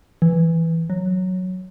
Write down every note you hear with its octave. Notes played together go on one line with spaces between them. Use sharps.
E3
F#3